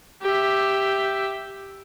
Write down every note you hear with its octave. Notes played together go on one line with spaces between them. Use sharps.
G4 E5